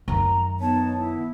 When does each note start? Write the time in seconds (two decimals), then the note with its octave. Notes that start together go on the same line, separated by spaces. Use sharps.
0.08 F#2 D#3 A#5
0.60 B3 D#4 C#5 A5
0.94 E4